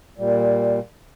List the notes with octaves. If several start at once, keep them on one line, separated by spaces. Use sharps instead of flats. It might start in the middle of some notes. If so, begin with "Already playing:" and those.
A#2 G3